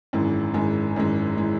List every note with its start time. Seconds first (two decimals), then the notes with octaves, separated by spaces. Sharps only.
0.13 G#1 F#2 E3 G#3
0.54 G#1 F#2 E3 G#3
0.96 G#1 F#2 E3 G#3
1.37 E3 G#3